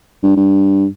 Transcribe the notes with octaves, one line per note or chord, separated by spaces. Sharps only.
G2
G2